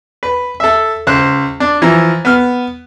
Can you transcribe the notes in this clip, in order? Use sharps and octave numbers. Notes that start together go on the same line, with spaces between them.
B4
A4 E5
C#2 C5 F#6
D4
E3 F3 A#5
B3 F6